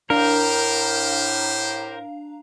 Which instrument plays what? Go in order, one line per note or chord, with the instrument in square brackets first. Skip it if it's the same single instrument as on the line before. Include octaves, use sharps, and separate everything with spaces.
[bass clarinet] A2 [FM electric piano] D4 F5 A#5 [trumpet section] G4 C5 [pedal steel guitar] A#4